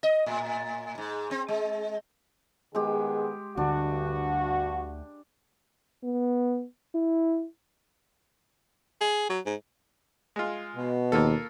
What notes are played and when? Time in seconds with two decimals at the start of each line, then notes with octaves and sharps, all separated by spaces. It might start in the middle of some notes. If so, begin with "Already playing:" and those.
0.03 D#5
0.26 A2
0.98 G#2
1.31 C4
1.48 G#3
2.75 D#3 G#3 B3 G4 G#4
3.57 D2 G2 D3 D4 F#4
6.04 B3
6.95 E4
9.01 G#4
9.29 F#3
9.46 G#2
10.36 G#3 F4
10.76 B2
11.12 D#2 A#3 F4 A4